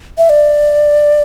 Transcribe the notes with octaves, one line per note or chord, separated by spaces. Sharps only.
E5
D5